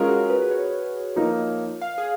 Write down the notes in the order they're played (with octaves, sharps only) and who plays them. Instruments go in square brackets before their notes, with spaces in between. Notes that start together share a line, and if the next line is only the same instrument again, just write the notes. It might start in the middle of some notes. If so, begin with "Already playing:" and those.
Already playing: [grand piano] G#3 C#4 F4 A#4 [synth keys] G#4
[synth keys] F#4
B4
B4
C#5
[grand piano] F3 A#3 D#4 A#4
[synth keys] F5
G#4